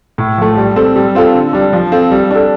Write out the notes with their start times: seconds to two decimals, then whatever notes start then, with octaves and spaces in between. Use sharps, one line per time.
0.18 A2
0.38 F3 A3
0.57 G3
0.76 C4 A4
0.96 G3
1.15 C4 F4 A4
1.34 D3
1.53 G3 D4
1.73 F3
1.92 C4 F4 A4
2.11 G3
2.31 D4 A4